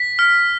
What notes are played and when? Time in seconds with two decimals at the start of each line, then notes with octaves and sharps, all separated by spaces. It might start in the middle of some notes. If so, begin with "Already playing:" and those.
Already playing: B6
0.19 F6